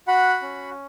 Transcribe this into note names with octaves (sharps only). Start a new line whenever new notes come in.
F#4 F#5 B5
C#4